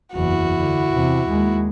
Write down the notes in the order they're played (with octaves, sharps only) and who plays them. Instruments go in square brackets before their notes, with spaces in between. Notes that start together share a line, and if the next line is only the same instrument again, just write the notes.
[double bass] F#1 E2 [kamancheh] E4 F#4
[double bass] D3
E2 C3
D#2 G#3